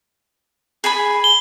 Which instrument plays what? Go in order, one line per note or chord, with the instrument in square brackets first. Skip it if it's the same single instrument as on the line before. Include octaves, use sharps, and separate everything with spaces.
[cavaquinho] G#4 G#5 B5
[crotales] G7